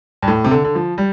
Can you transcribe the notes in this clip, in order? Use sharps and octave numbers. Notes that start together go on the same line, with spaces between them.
G2
A2
C3
D3
D3
F3
G3